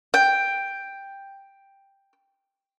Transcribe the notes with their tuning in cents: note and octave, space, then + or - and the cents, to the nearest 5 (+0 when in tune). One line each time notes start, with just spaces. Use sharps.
G5 +5